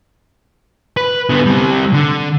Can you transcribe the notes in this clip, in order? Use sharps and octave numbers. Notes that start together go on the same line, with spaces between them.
B4
D3 B3
G3 C4
D3